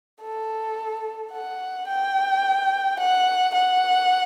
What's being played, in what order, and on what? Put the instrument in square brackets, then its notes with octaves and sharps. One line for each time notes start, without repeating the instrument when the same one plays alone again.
[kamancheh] A4
F#5
G5
F#5
F#5